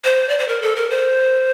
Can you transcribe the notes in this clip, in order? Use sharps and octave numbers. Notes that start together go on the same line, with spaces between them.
C5
D5
C5
A#4
A4
A#4
C5